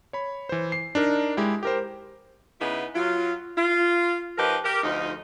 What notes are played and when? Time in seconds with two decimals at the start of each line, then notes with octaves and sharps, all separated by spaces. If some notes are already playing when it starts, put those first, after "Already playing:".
0.13 C#5 B5
0.49 E3 C5
0.72 C7
0.95 D4 D#4 A#4
1.37 G#3 E4 G4
1.63 G4 A#4 C5
2.60 C#3 B3 D#4 E4
2.95 F#3 F4
3.57 F4
4.38 F3 D#4 G4 A#4 B4
4.64 G4 A#4
4.83 D2 F3 D#4